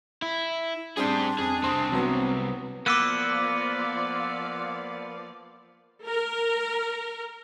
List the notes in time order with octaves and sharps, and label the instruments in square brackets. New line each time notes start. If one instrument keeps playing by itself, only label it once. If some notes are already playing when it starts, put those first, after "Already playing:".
[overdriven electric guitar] E4
[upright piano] G3 C4 [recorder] D4 [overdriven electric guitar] G#4 C5
[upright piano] F2 [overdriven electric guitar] G#4
[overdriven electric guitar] C2 C4 [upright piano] C6 D#6
[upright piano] F#3 B3
[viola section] F3 D5 F5 [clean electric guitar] A#3 B3 [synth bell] D6 E6 F#6
[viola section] A#4